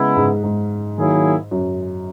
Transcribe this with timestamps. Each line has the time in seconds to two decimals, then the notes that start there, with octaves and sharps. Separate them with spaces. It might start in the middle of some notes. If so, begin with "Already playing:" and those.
Already playing: C#3 G#3 B3 E4
0.16 G#2
0.43 G#2
0.97 D#3 F#3 A#3 E4 G#4
1.51 F#2